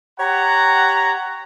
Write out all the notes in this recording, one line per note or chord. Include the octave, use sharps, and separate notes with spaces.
G4 C#5 F#5 A#5